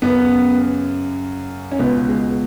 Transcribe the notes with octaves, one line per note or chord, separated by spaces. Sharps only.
F#2 C#3 B3
C#4
C#2 B2 B3
G#3